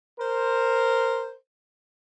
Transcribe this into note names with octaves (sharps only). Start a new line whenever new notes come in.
A#4 C5